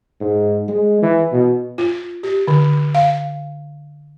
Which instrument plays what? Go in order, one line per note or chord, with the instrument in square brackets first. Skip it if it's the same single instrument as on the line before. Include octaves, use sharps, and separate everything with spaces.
[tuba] G#2
G#3
E3
B2
[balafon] F4
G4
D3
F5